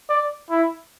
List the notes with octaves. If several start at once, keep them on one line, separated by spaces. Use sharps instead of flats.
D5
E4